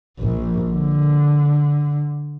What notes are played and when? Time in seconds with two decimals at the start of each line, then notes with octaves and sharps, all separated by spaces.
0.19 A#1
0.70 D3